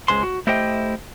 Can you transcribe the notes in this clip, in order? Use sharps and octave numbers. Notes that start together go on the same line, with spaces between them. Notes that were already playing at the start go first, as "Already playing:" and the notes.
C#2 F#2 G#3 C5 C6
F#4
A3 E4 G4 C5 D#5 G5